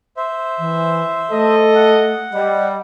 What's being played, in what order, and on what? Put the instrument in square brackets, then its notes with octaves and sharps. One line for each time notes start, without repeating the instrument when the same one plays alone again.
[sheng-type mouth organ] C5 E5
[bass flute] E3
[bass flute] A3 [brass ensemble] A4 D#5
[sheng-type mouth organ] F#5
[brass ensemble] G3 [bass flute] D#5